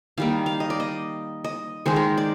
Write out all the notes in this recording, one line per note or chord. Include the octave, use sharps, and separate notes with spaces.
D#3 G3 A#3 F5
F5
D#5
D5
D#5
D#5
D#3 G#3 C5
A#4
D5